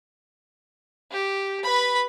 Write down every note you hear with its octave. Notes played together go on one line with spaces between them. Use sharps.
G4
B4 B5